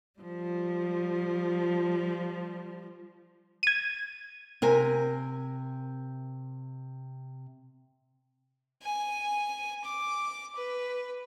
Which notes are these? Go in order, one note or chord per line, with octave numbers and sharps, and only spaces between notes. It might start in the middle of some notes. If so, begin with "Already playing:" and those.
F3 G3
G#6 D#7
C3 A#4 G#5
G#5
D6
B4